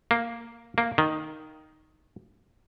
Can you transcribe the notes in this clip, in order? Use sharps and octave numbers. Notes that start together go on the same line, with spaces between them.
A#3
A#3
D#3